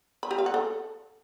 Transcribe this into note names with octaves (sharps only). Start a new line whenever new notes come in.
B5
G4
F5
F#5
A4